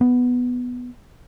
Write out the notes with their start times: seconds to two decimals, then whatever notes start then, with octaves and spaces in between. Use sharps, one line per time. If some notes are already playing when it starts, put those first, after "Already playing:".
0.01 B3